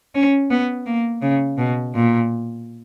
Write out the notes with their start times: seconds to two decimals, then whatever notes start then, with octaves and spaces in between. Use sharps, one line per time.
0.15 C#4
0.51 B3
0.86 A#3
1.22 C#3
1.58 B2
1.94 A#2